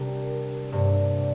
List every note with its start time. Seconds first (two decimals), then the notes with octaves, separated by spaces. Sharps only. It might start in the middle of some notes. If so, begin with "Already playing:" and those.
Already playing: C3 G3 D4 G4 A#4
0.72 G2 C3 A#3 D4 A#4 D5